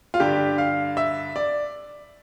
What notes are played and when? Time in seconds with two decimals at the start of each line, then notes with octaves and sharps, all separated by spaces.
0.14 F4
0.20 G2 D3 G4
0.58 F5
0.97 E5
1.36 D5